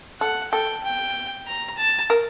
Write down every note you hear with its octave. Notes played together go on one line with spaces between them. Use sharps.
A4 F#5
A4 G5
G5
A#5
A5
A#4